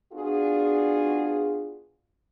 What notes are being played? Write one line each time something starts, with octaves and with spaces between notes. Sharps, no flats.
B3 D4 F4 F#4 G#4